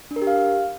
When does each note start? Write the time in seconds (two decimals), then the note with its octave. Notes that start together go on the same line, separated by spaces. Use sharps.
0.11 D4
0.16 A#4
0.22 G4
0.27 F5